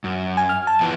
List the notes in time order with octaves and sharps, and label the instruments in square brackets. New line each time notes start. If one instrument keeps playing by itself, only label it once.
[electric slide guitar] F#2
[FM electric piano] G#5
F6
A5
[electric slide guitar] E3 F3 B3